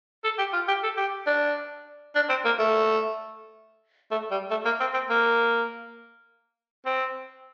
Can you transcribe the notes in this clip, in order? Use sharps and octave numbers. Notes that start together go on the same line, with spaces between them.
A4
G4
F4
G4
A4
G4
D4
D4
C4
A#3
A3
A3
G3
A3
A#3
C4
C4
A#3
C4